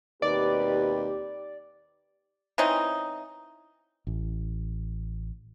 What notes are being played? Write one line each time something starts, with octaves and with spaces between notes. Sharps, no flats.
D#2 B2 C4 G4 B4 D5
E3 C4 C#4 D#4
A1